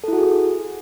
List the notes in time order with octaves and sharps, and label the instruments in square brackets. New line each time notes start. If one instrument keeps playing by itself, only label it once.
[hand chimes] A4
E4
F#4
G#4